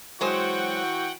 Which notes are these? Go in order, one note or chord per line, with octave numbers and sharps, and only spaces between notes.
E3 F#3 G#3 F#4 C5 F#5 G5 C#6